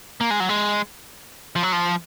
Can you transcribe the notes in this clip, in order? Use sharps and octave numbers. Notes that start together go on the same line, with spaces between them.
A#3
G#3
F#3
G#3
F3
F#3
F3